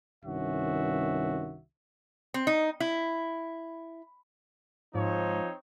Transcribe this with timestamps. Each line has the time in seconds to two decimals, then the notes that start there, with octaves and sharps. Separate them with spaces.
0.25 C2 G2 D#3 C#4 F#4 E5
2.34 C4
2.47 D#4
2.80 E4
4.95 G#2 F3 C4 D#4 C#5